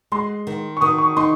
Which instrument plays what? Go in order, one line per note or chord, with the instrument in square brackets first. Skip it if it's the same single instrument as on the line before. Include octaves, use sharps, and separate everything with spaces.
[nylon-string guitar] G#3 [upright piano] C6
[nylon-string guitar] D#3
[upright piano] C#6
[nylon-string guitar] D#3 [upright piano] D#6
[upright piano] C#6
[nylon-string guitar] D#4 [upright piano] C6